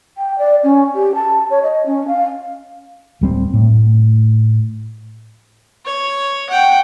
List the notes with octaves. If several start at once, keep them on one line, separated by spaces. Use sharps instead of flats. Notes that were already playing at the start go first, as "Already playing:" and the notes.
G5
D5
C#4
G4
A5
C#5
D#5
C#4
F5
D1 G3 C4
A2
C#5
F#5 G5